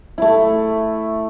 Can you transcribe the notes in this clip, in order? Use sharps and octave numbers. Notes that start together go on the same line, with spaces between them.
A3 E4